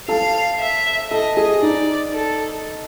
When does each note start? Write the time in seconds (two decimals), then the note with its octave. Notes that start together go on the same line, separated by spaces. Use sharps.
0.08 A4 F5 A5
0.60 E5
1.11 A4 D#5 A5
1.36 G#4 G#5
1.62 D#4 D5 D#5
2.14 A4